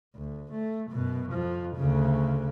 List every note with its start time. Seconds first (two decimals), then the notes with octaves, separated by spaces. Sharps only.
0.16 D2
0.52 A3
0.91 F#2 B2
1.32 F2 F3
1.76 D2 C#3